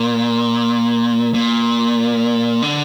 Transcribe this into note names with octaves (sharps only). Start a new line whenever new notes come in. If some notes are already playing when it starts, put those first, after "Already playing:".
Already playing: A#2
A#2
D3